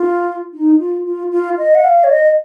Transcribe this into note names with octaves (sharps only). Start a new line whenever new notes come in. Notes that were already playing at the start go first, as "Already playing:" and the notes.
Already playing: F4
D#4
F4
F4
F4
D#5
F#5
F5
C#5
D#5